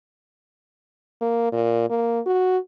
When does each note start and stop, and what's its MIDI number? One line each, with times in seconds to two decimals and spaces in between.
1.21 1.50 58
1.52 1.88 46
1.90 2.20 58
2.26 2.58 66